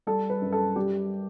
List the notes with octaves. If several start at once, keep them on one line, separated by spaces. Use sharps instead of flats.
G3 A4
B4
F#2
A4
G3 G4